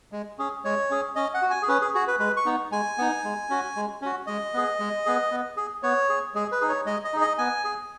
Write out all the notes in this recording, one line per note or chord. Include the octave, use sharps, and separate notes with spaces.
G#3
C#4 G#4
G#3 C#5
C#4 G#4
C#4 D#5
F#5
F#4
G#5
G#4
C#4 B4
G#4
F#4 G#4
B4
G#3 B4
C#6
B3 D#4
G#3 G#5
B3 D#4
G#3
C#4 F#4
G#3
C#4 F#4
G#3 D#5
B3 G#4
G#3
B3 G#4
B3
G#4
B3 C#5
G#4
G#3 G#4
B4
D#4 G#4
C#5
G#3 D#5
D#5
D#4 G#4
D#5
B3 G#5
G#4